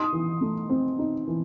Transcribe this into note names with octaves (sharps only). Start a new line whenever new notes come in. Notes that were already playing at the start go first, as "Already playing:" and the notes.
Already playing: D#4 C6 D#6
E3
A3
C4
D#4
E3